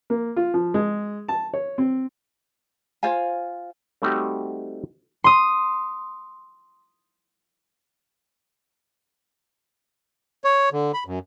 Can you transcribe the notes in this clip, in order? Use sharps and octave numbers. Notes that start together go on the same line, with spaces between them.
A#3
F4
F3
G#3
A5
C#5
C4
F4 C5 F5 G#5
G3 A3 C4 D#4 F#4 G4
C6 D#6
C#5
D3
B5
F#2